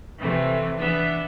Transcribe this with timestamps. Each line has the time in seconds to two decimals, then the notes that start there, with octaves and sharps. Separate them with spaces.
0.20 C3 E3 A3 C4
0.79 E3 B3 D4 E5